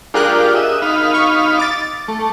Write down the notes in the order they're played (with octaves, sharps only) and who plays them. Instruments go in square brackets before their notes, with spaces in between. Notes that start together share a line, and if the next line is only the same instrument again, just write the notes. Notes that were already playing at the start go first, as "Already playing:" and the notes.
[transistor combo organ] D4 F4 G4 [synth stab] G#4 A#4 F#6
[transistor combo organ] D#5 E5
D#4 F5 B5
[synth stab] C#6
D6 A6
[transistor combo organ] A3